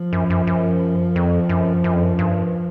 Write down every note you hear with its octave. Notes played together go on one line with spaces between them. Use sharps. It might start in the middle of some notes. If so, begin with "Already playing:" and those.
Already playing: F3
F#2
F#2
F#2
F2
F#2
F#2
F2
F#2
G2